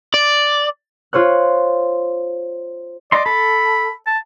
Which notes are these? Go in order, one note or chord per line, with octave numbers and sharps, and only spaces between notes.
D5
F4 C5 C#5 F#6
D5 D#5 C6
A4 B5
A5